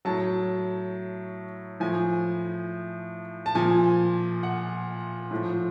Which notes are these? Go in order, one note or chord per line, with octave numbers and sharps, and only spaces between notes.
A2 F#3 A5
A2 F3 G#5
A5
A#2 F3 G#5
F#5
A2 F3